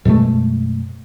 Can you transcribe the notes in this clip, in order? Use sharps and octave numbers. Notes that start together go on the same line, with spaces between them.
F#2 B2 G#3 A3